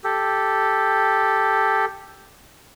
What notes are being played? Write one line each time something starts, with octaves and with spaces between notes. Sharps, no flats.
G4 A4